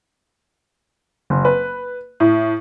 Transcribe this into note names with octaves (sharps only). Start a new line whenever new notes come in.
F#1
B4
A2